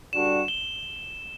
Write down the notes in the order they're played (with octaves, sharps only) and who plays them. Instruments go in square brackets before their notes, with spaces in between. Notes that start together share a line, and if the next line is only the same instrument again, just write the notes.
[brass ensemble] G2 D3 G3 D4 F#4 [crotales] E7
[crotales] G7